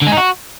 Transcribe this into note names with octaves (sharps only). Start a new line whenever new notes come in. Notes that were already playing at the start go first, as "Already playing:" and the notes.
D3
G#3
D#4
F#4